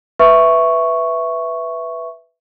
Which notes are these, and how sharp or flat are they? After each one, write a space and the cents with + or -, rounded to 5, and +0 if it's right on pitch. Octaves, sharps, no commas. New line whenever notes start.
B4 +0 E5 +0 C#6 +0